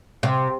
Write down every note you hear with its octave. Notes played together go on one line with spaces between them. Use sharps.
C3